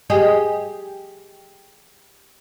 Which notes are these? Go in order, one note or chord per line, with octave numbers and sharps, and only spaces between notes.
G4 G#4 D#5